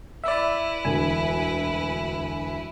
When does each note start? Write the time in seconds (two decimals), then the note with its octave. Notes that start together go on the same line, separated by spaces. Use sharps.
0.24 E4 B4 D5 E5
0.85 E1 D2 G#5